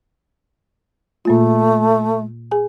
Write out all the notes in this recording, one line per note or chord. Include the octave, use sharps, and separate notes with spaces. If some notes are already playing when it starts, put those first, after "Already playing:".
A#2 A3 A#3 F4
G#4 G#5